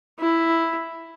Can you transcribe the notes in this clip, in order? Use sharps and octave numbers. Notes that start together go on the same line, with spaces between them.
E4